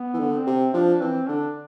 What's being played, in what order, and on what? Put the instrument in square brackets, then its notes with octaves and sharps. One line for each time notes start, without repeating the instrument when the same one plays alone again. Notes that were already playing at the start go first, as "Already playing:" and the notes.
Already playing: [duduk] B3
[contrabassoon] E3
D3
[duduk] C4
[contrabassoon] C3
[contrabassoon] F3 [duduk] D4
[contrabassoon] E3 [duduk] C4
[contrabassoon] D3 [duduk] D4